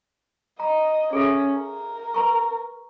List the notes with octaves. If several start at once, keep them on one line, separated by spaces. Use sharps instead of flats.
D#5 A#5
C#4 G#4 A4 E5
A#4
B4 A#5 C#6